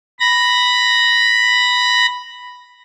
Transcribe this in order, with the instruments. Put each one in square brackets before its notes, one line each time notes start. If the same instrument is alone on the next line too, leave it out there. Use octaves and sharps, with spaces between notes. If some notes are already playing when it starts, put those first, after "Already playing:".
[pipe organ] B5 A#6